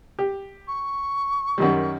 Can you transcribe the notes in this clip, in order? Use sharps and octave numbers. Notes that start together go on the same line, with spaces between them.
G4
C#6
F#2 D#3 G3